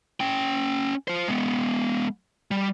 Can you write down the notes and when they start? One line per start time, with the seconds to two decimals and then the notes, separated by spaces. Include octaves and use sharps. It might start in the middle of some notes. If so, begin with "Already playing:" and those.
0.20 C#4 G5
1.08 F4 C5
1.28 G#3 B3
2.51 G3